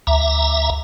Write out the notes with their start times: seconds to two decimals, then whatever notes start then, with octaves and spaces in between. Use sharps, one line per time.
0.07 D2 E5 A#5